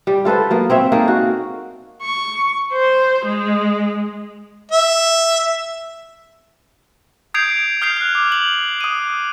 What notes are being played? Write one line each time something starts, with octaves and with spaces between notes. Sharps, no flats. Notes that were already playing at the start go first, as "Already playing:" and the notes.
G3
F4 A4 B4 C5
F#3 A#3 B3
C4 C#5 E5
A#3 D#4 G#4 A4
F#4
C#6
C5
G#3
E5
D#6 G6 G#6 C7 D7 F7
D#6 F6 G6 C7 F7
F6 F#6
D6
F#7
D#6 D#7